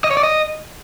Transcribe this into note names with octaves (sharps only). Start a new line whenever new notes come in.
D#5
C#5
D5
D#5